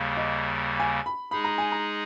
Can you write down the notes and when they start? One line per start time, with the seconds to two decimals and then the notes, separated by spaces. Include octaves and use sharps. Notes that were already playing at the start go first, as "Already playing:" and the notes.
Already playing: D#2 C#3 G3 A#3
0.17 D#5
0.79 G#5
1.06 B5
1.31 G#3 D#4 G#4 B5
1.44 A#5
1.58 G#5
1.72 A#5